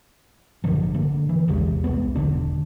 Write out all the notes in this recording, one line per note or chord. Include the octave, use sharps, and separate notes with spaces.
A1 G2 D3 F3
D3 A#3
E3
A#1 E2 C3 G#3
C2 A3 B3
E1 D#2 D3 D4